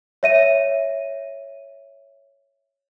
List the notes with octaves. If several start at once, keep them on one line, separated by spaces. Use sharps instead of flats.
C#5 E5 D#7